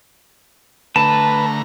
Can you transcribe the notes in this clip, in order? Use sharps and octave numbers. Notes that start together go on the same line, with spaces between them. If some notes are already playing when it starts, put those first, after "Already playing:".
D3 A3 B4 A5 A#5